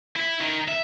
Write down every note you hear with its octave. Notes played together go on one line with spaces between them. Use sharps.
E4
D#3
E5